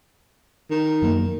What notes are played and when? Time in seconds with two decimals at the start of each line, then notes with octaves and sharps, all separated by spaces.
0.71 D#3
1.02 F#2 F#3 A#3